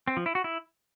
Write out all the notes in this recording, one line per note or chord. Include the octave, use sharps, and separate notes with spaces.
C4
F3
E4
F#4
E4